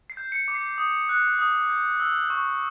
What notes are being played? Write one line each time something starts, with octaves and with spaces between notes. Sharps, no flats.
C7
G6
C#7
D6
C7
D#6
F#6
D#6
G6
E6
C#6